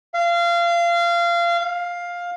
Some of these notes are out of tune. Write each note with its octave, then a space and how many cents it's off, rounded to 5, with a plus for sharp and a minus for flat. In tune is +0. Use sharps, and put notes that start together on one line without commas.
F5 -25
F5 +10